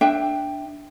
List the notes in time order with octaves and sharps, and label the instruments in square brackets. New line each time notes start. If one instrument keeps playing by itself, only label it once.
[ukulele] D4 E5 G5